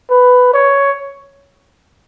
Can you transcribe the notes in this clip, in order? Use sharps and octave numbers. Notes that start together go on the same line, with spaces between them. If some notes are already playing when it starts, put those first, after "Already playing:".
B4
C#5